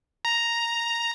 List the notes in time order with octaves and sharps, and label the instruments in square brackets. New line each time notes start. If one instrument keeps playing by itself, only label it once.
[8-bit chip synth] A#5